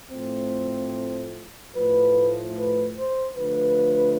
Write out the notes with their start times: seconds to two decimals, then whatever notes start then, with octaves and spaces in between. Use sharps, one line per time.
0.11 A2 F3 A3 C4
1.73 A2 F3 A3 B4
2.55 B4
2.96 C5
3.36 D3 F3 A3 B4